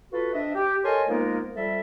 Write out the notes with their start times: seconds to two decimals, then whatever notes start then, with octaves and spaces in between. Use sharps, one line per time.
0.12 F4 F#4 A4 B4
0.33 C4 D4 D#5 E5
0.54 G4
0.84 A4 A#4 C#5 D#5 G#5 C6
1.08 F3 G#3 A#3 B3 D#4 A#4
1.56 F2 G3 A4 E5